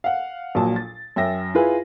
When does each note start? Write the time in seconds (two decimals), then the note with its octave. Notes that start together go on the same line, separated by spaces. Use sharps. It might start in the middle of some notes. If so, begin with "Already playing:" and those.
0.04 F5 F#5
0.55 A#1 A#2 F#3 A5
0.76 A6
1.16 F#2 E5 G5 A#6
1.55 E4 F4 G#4 B4